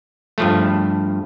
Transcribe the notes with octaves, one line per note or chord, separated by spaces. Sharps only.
G2 F3 A3